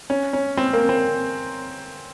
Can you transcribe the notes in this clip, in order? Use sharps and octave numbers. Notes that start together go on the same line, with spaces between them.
C#4
C#4
C4
A#3
C4